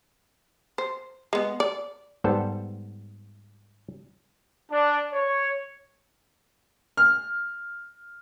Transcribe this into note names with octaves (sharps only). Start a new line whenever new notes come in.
C5
G#3 B3
D5
G#2 G3 B3 A4 C5 A5
D4
C#5
F6